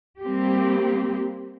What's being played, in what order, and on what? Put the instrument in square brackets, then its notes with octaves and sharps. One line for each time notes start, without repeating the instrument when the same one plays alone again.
[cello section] G3 A#3 C4 G4